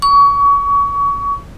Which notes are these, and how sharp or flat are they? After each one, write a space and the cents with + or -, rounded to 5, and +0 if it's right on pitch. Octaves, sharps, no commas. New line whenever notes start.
C#6 +30